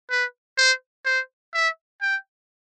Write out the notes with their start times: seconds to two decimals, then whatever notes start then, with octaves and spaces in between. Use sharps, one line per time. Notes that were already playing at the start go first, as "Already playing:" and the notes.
0.10 B4
0.57 C5
1.05 C5
1.54 E5
2.01 G5